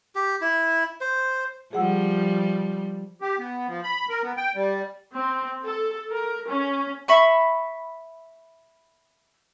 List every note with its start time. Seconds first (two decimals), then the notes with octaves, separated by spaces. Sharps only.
0.15 G4
0.41 E4
1.01 C5
1.73 F3 G3 G#4 F#5 E6
3.21 G4
3.38 B3
3.68 F3
3.84 B5
4.09 A#4
4.23 B3
4.37 G5
4.55 G3
5.13 C4
5.63 A4
6.10 A#4
6.47 C#4
7.08 E5 B5 C#6